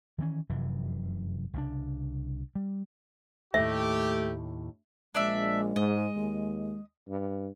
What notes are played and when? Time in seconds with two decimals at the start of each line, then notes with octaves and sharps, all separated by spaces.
0.18 D#3 E3 B3 C#4
0.49 F1 F#2 C3 E3
1.53 C2 C#3 G3 D4
2.55 G3
3.54 D#2 A2 A3 G4 E5
5.15 A#1 G#3 D4 D5 E5
5.76 G#2 D#5
6.16 D#2
7.08 G2